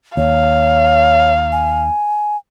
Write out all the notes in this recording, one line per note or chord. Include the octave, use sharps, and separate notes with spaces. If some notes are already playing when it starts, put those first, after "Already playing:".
D#2 C#5 F5
G#5